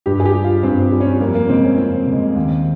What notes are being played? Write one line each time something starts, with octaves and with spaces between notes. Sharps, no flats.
G2 G4
G#4
G4
G3
F4
G2 C4
G3
C#4
C4
F2 A#3
A#3
C#3 G#3 C4
C#4
F2 C4
C#3
G#3
D#2